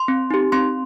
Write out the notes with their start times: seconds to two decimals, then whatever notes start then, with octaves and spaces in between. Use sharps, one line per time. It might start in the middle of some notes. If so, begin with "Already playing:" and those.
Already playing: C6
0.08 C4
0.31 D#4 G4
0.52 C4 C6